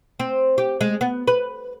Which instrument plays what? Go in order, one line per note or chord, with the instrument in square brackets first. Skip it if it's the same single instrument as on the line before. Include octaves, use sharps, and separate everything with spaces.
[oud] C4
G4
G#3
B3
B4